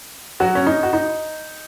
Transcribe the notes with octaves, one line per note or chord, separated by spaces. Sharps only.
F#3 F#4
C#4
D#4
F#4
D#4